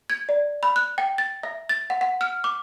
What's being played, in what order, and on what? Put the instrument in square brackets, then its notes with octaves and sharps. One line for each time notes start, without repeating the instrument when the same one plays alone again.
[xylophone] G#6
D5
B5
F#6
G5
A6
E5
A6
F#5
F#5
F6
D6